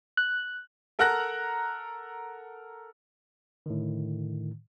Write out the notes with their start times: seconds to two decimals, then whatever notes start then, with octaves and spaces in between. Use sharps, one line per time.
0.17 F#6
0.99 A4 A#4 F#5 A#5 F#6 A#6
3.66 A2 D3 D#3